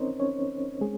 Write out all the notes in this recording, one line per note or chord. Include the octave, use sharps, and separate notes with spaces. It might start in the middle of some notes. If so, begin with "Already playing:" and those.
Already playing: C4 C#4 D#4 A#4 C5 C#5 D#5
C#4 C#5
G#3 G#4